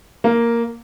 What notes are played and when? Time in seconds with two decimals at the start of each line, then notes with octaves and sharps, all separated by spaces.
0.24 A#3